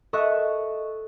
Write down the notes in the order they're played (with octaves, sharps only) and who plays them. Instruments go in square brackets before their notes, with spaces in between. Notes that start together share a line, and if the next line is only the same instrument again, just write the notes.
[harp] A4 D#5 E5 C#6 F#6